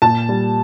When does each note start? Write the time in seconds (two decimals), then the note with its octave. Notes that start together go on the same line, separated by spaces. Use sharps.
0.02 A#2 A5
0.29 G3